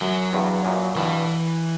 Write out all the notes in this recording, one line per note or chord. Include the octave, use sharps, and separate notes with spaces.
F#2 F#3
E2 G2
F#2 A#2
G2 B2 E3